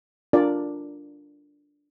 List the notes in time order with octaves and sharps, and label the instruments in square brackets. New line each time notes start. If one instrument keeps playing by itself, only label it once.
[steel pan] D4 F4 A#4 D5